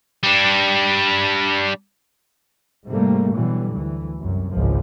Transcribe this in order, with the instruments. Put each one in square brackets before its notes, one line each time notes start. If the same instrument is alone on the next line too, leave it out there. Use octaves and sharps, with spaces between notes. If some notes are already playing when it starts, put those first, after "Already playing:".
[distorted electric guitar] G3 D4
[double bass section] G#2 C3 G3 A3 A#3
B2 D3 E3 F#3 G3
D2 E3
C2 F#2
G#1 C#2 F3